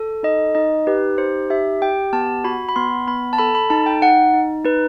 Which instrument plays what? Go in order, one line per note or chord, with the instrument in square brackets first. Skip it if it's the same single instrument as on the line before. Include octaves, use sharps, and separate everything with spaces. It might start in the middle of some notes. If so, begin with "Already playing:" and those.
Already playing: [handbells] A4
D#4 D#5
D#4 D#5
G4 B4
D#4 C5
G4 E5
G4 G5
B3 A5
F#4 B5
B5
B3 C6
B3 B5
A5
A4 B5
B5
D#4 A5
G5
D#4 F#5
D#4
D#4 B4